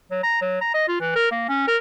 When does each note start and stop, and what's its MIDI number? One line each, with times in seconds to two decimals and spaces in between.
0.11 0.19 54
0.23 0.40 82
0.41 0.59 54
0.61 0.70 82
0.74 0.84 75
0.88 0.98 65
1.01 1.15 52
1.16 1.30 70
1.31 1.48 58
1.49 1.63 61
1.68 1.77 70